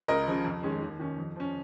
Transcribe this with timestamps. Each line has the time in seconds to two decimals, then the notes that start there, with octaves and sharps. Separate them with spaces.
0.08 C#2 A#4 D#5
0.27 C#3 F3
0.44 F2
0.63 D#3 G#3 C#4
0.82 D#2
0.99 D#3 C#4
1.19 F2
1.36 F3 C#4